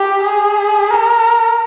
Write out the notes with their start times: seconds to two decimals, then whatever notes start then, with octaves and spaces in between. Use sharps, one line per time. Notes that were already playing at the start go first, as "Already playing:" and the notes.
Already playing: G4
0.24 G#4
0.90 A#4